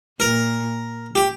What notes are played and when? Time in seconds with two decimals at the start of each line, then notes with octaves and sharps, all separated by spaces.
0.20 A#2 A#4
1.15 G4